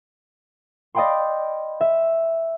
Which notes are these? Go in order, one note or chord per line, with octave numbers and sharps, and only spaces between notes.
D5 D#5 F5 G5 B5 C6
E5